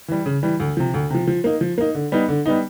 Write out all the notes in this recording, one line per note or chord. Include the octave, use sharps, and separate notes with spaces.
E3 G3
C#3
E3 G3
D2
C3 F3
D2
C3 F3
F3
A#3 D#4
F3
A#3 D#4
D3
G3 B3 D#4
D3
G3 B3 D#4